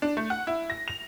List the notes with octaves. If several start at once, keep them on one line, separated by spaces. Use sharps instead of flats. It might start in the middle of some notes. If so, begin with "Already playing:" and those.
D4
A3
F#5
E4
A#6
F7